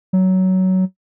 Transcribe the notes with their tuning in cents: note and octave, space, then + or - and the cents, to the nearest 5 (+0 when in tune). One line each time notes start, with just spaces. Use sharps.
F#3 +15